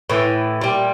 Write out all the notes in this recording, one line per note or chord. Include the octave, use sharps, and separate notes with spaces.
A2 E3
A#2 G3